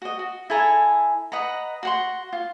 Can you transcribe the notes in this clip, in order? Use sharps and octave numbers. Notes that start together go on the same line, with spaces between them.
F#4 D#5
F#4
E4 A4 G#5 A#5
B4 D#5 F#5 A#5
F#4 F#5 C6
F4